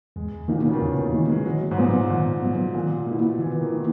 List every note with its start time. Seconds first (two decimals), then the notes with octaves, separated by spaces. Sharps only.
0.16 E2 G#3
0.48 A#2 D#3 A#3 D#4
0.59 B2
0.66 C#3
0.73 D#3
0.81 E2 E3
0.97 D#3
1.13 D#3 E3 A#3 D#4
1.29 G#3
1.45 D#3 F#3
1.71 G#2
1.77 A#2 F#3 B3
2.10 G#2 D#3
2.42 F#3 B3
2.75 A#2 D#3
3.07 B2 A#3 E4
3.39 D#3 E3
3.61 D#3
3.72 A#3 E4